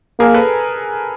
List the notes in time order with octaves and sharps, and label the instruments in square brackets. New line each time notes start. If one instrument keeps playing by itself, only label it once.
[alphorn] A#3 [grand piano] G#4 A#4
[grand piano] A4 B4